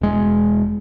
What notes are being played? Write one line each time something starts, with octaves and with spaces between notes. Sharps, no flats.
E1 G#3